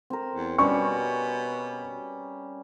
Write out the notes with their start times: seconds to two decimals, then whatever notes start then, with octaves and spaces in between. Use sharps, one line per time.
0.10 C4 A#4
0.36 E2
0.58 B2 G3 C#4 C#6